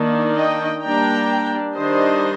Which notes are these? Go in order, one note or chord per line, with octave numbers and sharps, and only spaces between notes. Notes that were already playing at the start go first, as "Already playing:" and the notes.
Already playing: D#3 A#3 D4
D#5 G5
G3 A#3 D4 G5 A#5
D#3 G3 D4 C5 D#5